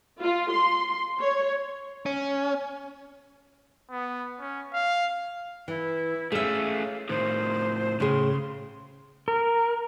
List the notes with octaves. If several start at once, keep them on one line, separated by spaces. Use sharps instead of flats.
F4
C6
C#5
C#4
B3
C#4
F5
E3 E4
A3 C#4 G#4 E5 F5
A2 D#3 C5
A2 C#3 G#4 C6
A#4